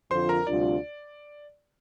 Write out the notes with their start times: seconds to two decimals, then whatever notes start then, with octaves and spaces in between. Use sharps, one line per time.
0.11 F2 D3 F3 C4 F4 C5 C6
0.29 A#4 A#5
0.47 D2 C3 G3 D4 F4 D5